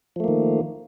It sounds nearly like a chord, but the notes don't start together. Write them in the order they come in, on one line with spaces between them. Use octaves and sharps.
F3 A3 A#3 D#3